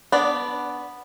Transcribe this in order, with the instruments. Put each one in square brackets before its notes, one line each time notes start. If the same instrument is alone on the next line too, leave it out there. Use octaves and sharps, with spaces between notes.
[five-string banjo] B3 D4 D5